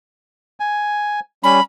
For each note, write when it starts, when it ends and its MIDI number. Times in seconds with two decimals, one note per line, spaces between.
0.60 1.20 80
1.44 1.60 55
1.44 1.60 61
1.44 1.62 83